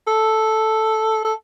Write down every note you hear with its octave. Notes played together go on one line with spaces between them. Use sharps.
A4
A4